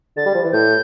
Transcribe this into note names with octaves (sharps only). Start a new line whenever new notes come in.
D3 A6
G3
F3
E3
A2 G6